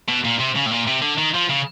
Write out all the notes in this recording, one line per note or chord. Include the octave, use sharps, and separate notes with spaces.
B2
A#2
C3
C#3
A2
A#2
C3
D3
D#3
F3
C#3